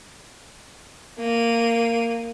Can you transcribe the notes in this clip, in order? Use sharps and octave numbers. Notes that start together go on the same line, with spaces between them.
A#3 D#7